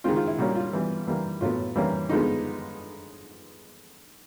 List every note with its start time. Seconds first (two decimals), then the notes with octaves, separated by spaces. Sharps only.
0.04 D#3 G#3 C4 F4
0.16 F4
0.27 E4
0.38 A#2 G3 A#3 C#4 F#4
0.55 F4
0.73 E3 G3 B3
1.07 E3 G3 A#3
1.41 A2 F#3 B3 F4
1.76 E3 G3 A#3 C#4
2.09 D3 F3 G#3 B3 D#4